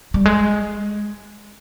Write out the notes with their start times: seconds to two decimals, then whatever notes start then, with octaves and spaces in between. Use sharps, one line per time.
0.14 G3
0.26 G#3